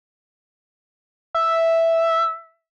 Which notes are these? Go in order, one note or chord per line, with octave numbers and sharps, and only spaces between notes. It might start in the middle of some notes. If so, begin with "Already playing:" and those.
E5